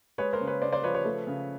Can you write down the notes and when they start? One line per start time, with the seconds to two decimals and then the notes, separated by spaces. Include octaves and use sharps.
0.18 G#3 B4 C#5
0.33 A#4 C5
0.40 C#3
0.47 B4 C#5
0.62 C#3 C5 D5
0.72 C5 D5
0.84 F3 B4 C#5
0.94 B4 C#5
1.05 A3
1.27 C#3